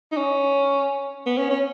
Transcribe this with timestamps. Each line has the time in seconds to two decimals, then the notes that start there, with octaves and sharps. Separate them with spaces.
0.12 D#4
0.17 C#4
1.26 B3
1.38 C#4
1.50 C#4